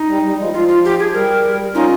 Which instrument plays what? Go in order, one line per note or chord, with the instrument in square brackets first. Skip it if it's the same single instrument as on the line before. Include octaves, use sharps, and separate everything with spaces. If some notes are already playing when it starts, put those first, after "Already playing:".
Already playing: [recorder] D#4
[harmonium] G3
G3
F3 G#3
[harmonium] F3 [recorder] F4
[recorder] F4
G4
G#4
[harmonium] G3 [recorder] A#4
[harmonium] C#4 F4 [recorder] D#4